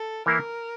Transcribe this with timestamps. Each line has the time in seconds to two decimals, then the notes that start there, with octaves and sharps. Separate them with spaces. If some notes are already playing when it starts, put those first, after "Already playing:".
Already playing: A4
0.26 E3 A#3 E4 A#4